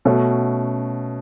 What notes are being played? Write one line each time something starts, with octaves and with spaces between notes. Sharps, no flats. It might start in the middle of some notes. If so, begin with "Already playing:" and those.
B2 A3 C#4 F#4